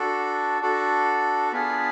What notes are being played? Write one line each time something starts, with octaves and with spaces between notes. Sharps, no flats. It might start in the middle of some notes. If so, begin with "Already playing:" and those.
Already playing: D4 F#4 A4
D4 F#4 A4
B3 D4 F4 G#4